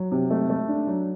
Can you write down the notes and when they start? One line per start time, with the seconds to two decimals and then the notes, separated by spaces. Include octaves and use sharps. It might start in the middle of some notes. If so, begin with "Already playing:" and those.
Already playing: F#3
0.11 C3
0.30 A3
0.49 A3
0.68 D4
0.87 F#3